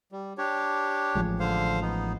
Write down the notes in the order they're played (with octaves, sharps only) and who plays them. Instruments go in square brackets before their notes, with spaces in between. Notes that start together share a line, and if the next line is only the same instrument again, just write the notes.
[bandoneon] G3
D4 G4 C#5
[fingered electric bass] A1 F3 G#3
[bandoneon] D3 C5 F5
B3 D#4